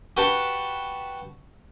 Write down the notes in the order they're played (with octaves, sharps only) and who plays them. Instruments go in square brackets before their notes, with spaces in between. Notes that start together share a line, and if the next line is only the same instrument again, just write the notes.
[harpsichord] F#4 G4 B4 F#5 G5 A5